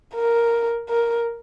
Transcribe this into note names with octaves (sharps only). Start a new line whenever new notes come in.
A#4
A#4